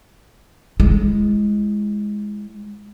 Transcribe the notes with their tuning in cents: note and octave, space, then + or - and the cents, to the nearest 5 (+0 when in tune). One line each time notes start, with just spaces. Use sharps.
G#3 +0 E4 +15